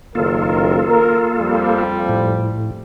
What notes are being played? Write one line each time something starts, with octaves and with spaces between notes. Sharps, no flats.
F#1 D#3 A#3 F4 A4 A#4
A#4
F2 F3 G3
A2